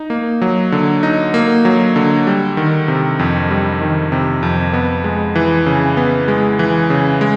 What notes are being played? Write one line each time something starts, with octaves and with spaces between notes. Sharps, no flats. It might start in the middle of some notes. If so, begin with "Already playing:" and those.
Already playing: D#4
A#3
F#3
D3
D#4
A#3
F#3
D3
G3
D#3
C3
F2
G3
D#3
C3
F2
B3
G#3
E3
C#3
B3
G#3
E3
C#3
G#3